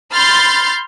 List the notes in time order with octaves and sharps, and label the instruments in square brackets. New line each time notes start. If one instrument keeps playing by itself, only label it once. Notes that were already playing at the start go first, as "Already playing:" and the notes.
[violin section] B5 C6 F6 G6 A6 C7